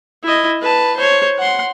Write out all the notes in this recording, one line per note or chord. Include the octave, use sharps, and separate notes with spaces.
E4 D#5
B4 A5
C5 C#5
F#5 C6